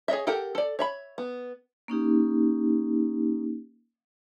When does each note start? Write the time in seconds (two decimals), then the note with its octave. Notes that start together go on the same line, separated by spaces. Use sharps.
0.08 G#4 C#5 D#5 E5
0.27 G4 A4 A#4 F#5 G5
0.55 A4 D5
0.79 C#5 E5 B5
1.18 B3
1.88 A#3 C#4 D#4 G4